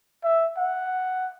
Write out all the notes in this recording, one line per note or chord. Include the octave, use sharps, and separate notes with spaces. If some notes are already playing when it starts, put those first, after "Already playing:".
E5
F#5